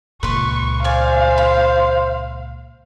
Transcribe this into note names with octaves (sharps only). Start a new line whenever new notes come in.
C#2 A#2 B4 C6 C#6
C5 D5 F5 G#5
B5